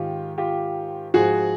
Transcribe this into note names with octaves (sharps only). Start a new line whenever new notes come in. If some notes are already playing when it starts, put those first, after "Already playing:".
Already playing: G#2 D#3 F4 G4
F4 G4
G#2 F3 F#4 G#4